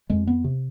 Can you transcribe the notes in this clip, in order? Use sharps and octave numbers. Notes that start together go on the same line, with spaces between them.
F2 G#3
B3
C3